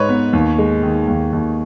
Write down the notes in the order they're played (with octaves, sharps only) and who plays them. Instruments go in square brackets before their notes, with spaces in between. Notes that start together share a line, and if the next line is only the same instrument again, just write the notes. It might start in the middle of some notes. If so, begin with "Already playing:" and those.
Already playing: [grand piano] G#2 D#4 B4 C#5
B3
D#2
G#3
D#3
D#2
D#2